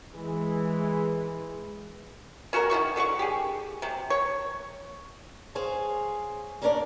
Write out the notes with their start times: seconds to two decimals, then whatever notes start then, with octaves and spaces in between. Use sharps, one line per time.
0.15 E3 G#3
2.53 C#4 F#4 A4 A#4
2.70 D#3 E4 F#4 C#6
2.96 D3 F#3 F#5 C#6
3.19 G4 G#4
3.82 C3 F#3
4.10 C#5
5.55 G#4 C5 C#5 F5 G#5
6.62 G3 A#3 C#4 D4 A#4 D5